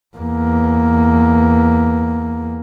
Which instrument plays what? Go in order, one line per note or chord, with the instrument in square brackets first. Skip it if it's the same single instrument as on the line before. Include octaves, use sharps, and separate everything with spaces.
[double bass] E2 A#3